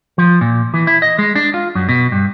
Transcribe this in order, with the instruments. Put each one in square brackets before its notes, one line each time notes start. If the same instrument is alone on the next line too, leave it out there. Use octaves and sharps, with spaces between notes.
[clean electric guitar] F3
A#2
E3
E4
D#5
G#3
D4
F4
F#2
B2
G2